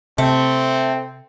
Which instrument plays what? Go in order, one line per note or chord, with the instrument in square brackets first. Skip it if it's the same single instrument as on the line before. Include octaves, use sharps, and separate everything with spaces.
[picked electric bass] C3 [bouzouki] A3 [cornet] C4